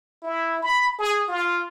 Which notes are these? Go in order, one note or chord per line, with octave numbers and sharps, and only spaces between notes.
E4
B5
G#4
F4